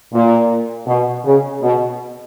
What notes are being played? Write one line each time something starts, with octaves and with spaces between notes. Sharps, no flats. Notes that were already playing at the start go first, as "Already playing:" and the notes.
A#2
B2
C#3
B2